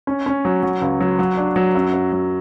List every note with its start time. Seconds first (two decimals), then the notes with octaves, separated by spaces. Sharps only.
0.07 C#4
0.26 C#4
0.45 F#3
0.63 F#3
0.82 C#2
1.01 F#3
1.19 F#3
1.37 D4
1.56 F#3
1.75 F#2
1.93 F#2
2.12 F#3